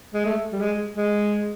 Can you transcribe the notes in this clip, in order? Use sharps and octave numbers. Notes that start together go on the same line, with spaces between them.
G#3
A3
G3
G#3
G#3